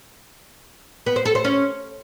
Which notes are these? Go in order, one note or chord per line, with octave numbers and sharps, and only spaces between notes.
B3
C5
A4
C5
C#4